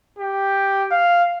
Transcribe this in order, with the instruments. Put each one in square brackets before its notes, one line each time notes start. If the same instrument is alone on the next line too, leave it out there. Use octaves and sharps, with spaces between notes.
[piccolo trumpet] G4
F5